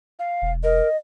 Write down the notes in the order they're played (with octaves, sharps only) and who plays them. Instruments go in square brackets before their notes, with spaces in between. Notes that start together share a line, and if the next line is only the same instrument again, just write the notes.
[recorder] F5
[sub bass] E1
[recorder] A#4 [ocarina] D#5